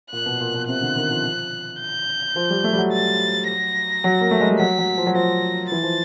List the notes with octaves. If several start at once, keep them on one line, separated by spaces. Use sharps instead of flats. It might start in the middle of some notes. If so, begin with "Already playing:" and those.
A#2 F#6
B2
A#2
B2
C3 F#6
D3
D#3
F3
G6
F3
G3
A3
G3
F#3
A6
A#6
F#3
A#3
A3
G#3
G3
F#3 B6
F#3
F3
F#3
F3 A#6
E3 A6
F3